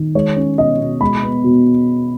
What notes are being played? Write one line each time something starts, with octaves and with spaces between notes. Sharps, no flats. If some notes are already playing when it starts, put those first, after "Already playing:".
Already playing: D#3
G#3 C#5
C#4
B2 D#5
B2
G#3 B5
B3
B2